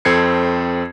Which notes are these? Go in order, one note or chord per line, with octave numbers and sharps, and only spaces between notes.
F2 C4 A4 G#6 C7 C#7